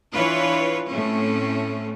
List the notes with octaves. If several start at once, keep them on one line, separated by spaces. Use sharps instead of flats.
E3 D4 F4 B4 C#5
A2 A3 C4 C#4